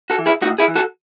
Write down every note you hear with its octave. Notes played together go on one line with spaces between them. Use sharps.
F#4 A4
E3
E4 G#4
A2 D#4 F#4
E4 G#4
E3
F#4 A4